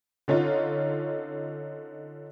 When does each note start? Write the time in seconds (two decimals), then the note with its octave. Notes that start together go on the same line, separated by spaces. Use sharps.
0.28 D3 C#4 D#4 F4